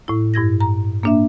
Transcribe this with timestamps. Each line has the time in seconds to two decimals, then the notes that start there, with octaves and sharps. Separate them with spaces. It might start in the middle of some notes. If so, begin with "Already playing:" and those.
0.08 A2 E4
0.34 G2 E4 G#6 A#6
0.61 A#5
1.03 A#3 D4 E5